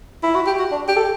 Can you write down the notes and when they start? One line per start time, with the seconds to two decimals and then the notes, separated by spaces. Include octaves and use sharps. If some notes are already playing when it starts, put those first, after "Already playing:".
0.23 E4
0.35 F#4
0.47 G4
0.59 F#4
0.72 D4
0.88 G4
0.97 A4